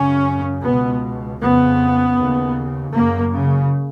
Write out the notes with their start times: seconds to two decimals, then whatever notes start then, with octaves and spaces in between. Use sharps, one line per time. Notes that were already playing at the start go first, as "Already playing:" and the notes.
Already playing: F#2 C#3 C#4
0.65 C#2 B2 B3
1.41 F2 C#3 B3
2.18 D#2 C#3
2.94 F#2 C#3 A#3
3.31 C#3